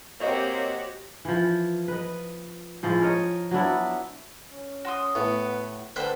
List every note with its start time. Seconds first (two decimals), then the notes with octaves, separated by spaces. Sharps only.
0.20 A#3 C4 F#4 G4 C5 C#5 D#5
1.25 E3 F3
1.88 B4 D#5
2.83 A2 F3 G#3
3.01 A#4 C#5 D#5
3.51 F#3 B3 D4 E4
4.51 C#4
4.85 F#4 C6 D#6
5.15 A2 B3
5.96 D3 A4 B4 C5 G5 F#6